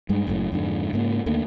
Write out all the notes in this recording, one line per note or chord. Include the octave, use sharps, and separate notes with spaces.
G2 G#3
F#1 F#2 A2
F2 G#2 D3
G#2 C#3 A#3
D#2 D3 A3 A#3